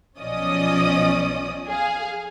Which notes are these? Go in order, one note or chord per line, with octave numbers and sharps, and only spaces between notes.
B1 F3 C#4 D5 D#5 D#6
G#4 F5